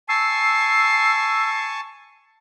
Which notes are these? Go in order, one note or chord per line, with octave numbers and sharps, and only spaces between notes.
G#5 A5 C#6 E6 C7